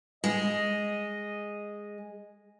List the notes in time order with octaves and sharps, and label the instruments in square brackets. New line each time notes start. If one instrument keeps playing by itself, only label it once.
[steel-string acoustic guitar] G#3 [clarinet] D#5